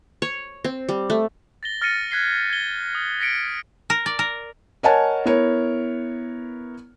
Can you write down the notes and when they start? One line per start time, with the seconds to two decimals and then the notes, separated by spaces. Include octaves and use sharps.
0.22 C#5
0.64 C4
0.89 G3
1.10 A3
1.63 A6 A#6 G7
1.82 F6 A6 A#6 C#7 D#7
2.11 F#6 G#6 B6 C7 G7
2.50 G#6 G7
2.95 D#6
3.20 A#6 B6 C#7 D7
3.90 A#4
4.06 D5
4.19 A#4
4.83 A#4 C#5 D#5 F#5 G#5 A5
5.26 B3 E4 A#4 C#5